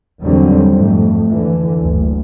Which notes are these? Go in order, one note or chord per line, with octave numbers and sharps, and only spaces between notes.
E2 D3 D#3 F#3 G3 C4
F2 G#2 A3
D3 E3
F#1 D2